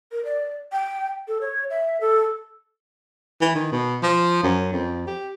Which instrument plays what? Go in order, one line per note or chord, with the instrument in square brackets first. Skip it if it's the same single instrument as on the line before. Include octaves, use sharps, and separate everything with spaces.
[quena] A#4
D5
G5
A4
C#5
E5
A4
[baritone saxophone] E3
D#3
B2
F3
F#2
F2
G4